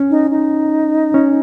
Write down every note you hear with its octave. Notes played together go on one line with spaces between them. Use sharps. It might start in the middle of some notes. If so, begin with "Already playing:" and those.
Already playing: C#4
D#4
D#4
C#4